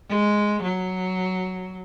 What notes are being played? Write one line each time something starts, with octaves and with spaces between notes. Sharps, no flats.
G#3
F#3